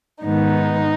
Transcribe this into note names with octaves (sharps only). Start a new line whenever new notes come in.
G#2 D#3 G#3 B3 D#4